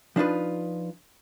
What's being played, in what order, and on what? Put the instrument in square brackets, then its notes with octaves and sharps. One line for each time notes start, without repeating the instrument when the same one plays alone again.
[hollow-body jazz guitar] F3 D4 D#4 F4 B4